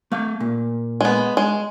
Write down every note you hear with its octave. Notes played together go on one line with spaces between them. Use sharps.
A3 F5
A#2
G#3 B3
G#3